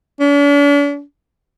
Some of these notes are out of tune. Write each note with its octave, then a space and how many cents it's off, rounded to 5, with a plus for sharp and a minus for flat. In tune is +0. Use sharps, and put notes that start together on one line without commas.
D4 -45